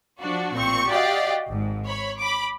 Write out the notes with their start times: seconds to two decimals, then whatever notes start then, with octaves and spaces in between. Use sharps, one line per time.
0.20 F3 D4 F#4
0.56 A1 A#2 C4 C#6
0.89 F#4 G4 D5 D#5 F5 G5
1.49 G#1 G#2
1.85 C#5 B5
2.19 B5 D6